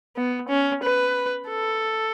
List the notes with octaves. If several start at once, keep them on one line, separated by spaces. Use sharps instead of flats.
B3
C#4
B4
A4